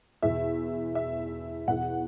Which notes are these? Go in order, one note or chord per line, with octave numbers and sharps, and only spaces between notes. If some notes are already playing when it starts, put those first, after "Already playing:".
E2 B2 E5
E5
E2 B2 F#5